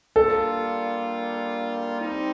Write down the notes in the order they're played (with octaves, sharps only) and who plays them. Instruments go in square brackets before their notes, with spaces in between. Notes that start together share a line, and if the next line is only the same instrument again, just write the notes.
[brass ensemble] G3 A#3 D4 F4 [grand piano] A4
[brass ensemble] G3 C4 D#4